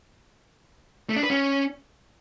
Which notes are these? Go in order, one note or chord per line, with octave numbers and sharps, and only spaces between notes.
A3
D4
B4
C#4